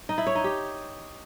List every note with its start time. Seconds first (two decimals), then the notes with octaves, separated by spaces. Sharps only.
0.09 D#4
0.18 E4
0.27 C#5
0.35 D#4
0.44 G4